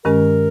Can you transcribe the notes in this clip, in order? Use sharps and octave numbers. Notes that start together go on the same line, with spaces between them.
G2 D#3 G#3 C#4 A#4